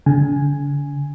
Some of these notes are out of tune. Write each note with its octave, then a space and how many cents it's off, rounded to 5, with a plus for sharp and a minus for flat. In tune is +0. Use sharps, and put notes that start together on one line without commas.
D3 -40 G#5 +0